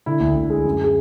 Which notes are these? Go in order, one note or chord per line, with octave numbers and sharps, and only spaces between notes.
D3 E4
D2
D2
G#3
F#2
G#4